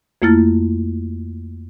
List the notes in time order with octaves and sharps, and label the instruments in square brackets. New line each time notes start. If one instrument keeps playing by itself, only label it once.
[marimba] F2 A3 A#3 E4 F6 A6